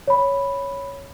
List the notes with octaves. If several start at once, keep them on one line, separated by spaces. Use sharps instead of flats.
C#5 B5